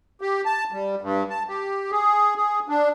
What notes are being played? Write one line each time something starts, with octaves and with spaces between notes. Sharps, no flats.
G4
A5
G3
G2
A5
G4
G#4
G#4
D4